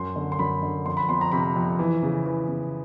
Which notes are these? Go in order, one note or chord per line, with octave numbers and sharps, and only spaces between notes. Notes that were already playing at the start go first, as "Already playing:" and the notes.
Already playing: F#2 C6
D3
C6
F#2 B5
D3
F2 C6
B5
F2 C6
A#5
C3 B5
F2
E3
C#3
E3
C#3